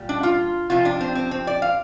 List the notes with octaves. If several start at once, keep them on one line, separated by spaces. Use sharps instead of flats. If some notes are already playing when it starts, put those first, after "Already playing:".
Already playing: A#2 G3
D4
F4
C3 F3 F4
D4
C4
C4
C4
D5
F5